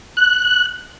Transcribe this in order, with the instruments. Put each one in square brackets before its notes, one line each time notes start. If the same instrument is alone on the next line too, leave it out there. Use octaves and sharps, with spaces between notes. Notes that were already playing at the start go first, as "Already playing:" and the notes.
[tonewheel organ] F#6